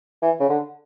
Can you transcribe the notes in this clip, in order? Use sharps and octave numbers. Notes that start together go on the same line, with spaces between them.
E3
C#3
D3